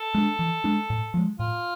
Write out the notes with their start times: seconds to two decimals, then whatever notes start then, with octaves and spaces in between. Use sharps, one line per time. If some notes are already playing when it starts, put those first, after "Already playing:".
Already playing: A4
0.14 G#3 D4
0.39 E3
0.64 G#3 D4
0.90 A2
1.14 F3 G#3
1.39 A2 F4